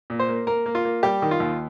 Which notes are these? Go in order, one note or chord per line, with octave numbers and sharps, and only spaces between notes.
A#2
C5
A#3
A#3 A#4
A#3
F4
A#3
G3 G4
D#3
F4
D#2